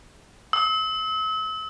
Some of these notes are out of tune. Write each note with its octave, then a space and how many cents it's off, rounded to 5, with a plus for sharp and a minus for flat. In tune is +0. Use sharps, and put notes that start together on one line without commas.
E6 -40